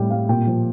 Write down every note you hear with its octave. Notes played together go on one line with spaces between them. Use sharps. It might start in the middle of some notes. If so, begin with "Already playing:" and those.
Already playing: A2 G3 G5
G3 F5
A#2 G5
F3